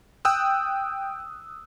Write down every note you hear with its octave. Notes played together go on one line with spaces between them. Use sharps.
G5 D#6 E6 F#6